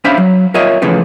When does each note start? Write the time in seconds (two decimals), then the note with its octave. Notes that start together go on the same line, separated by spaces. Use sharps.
0.04 C#4 D4 C5 E5 F5 B5
0.18 F#3
0.54 F4 A#4 C#5 D#5 E5
0.82 C#3 E3 F3 A3 C#4 B4